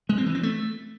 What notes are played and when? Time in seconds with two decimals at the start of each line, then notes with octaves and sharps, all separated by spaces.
0.09 G#3
0.18 C4
0.26 E3
0.35 C4
0.43 A3